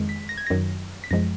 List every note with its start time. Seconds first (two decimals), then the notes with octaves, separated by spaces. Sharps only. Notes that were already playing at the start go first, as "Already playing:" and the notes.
Already playing: F2 D#3 G#3
0.09 B6
0.29 A#6
0.38 G#6
0.47 F#2 D#3 F#3 A#6
1.04 B6
1.11 F#2 F3 G#3 A#6